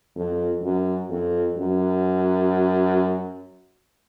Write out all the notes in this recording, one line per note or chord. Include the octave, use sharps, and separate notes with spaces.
F2
F#2
F2
F#2